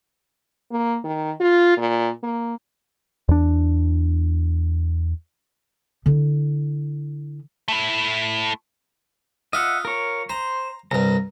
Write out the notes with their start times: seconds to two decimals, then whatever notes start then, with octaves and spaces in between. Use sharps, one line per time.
0.71 A#3
1.04 D#3
1.40 F4
1.78 A#2
2.23 A#3
3.29 E2 D4
6.06 D3 E4
7.68 A3 E4
9.53 F4 D#5 E5 F#5
9.85 A#4 C#5
10.29 C5 A#5
10.91 C2 G2 A#5